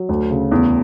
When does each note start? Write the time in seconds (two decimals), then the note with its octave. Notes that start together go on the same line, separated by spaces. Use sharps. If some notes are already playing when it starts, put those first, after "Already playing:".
Already playing: F#3
0.09 D2
0.31 C#3
0.52 E2